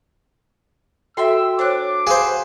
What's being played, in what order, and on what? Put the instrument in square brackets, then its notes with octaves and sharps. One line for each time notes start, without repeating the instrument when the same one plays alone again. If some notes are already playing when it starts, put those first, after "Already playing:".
[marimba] F#4 A4 [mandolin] E5 G5 C6 [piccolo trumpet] E6
[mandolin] D4 F#6 [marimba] C5 C#5 [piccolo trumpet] D6
[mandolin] F#4 B4 [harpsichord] G#4 C5 [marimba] F5